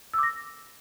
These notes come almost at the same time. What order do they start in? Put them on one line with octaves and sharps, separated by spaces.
E6 D6 A#6